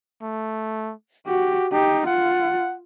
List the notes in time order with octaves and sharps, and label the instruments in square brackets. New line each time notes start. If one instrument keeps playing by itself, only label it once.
[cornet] A3
[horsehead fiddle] F#4 [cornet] G4
[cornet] D#4 [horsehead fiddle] G4
[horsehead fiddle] F4 [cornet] F#5